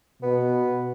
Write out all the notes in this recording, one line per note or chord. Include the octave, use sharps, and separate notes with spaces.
B2 B3